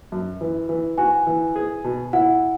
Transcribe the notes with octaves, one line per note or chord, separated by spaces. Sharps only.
F#2
E3
E3
F#4 G#5
E3
G#4
B2
E4 F#5